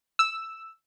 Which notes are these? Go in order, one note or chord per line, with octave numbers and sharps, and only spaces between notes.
E6